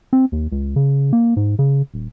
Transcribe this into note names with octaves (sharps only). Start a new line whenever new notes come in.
C4
D#2
C#2
C#3
A#3
G#2
C#3
D#1